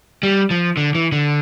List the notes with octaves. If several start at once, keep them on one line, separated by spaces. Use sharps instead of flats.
G3
F3
D3
E3
D3